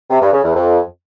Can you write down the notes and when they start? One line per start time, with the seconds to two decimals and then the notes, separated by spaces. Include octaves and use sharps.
0.10 C3
0.21 G2
0.32 C#3
0.43 E2
0.54 F2